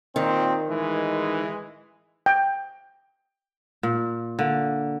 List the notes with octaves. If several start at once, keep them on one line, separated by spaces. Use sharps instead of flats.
A#2 D#3 C4
A1 E3 G#3
G5
A#2
D3 A#3